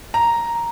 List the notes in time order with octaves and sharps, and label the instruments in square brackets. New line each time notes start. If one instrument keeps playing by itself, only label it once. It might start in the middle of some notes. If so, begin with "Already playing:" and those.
[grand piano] A#5